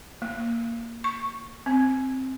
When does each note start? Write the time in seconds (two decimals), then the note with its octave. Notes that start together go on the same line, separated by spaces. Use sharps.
0.22 A#3
1.04 C#6
1.66 C4